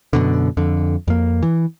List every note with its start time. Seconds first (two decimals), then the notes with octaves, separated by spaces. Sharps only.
0.13 F#2 B2 D3
0.57 F2 D3
1.08 F2 A#3
1.43 E3